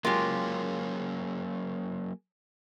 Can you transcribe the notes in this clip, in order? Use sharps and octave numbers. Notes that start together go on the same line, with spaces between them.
F#3 G#3 A#3 C#4 F4 G4 A#4